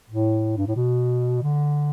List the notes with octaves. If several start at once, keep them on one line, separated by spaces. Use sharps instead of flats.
A2
G2
A2
B2
D3